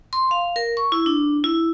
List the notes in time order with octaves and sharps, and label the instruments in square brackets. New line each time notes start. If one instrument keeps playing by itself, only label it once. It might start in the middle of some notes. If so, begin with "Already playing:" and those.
[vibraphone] C6
F5
A#4
C#6
E4
D4
E4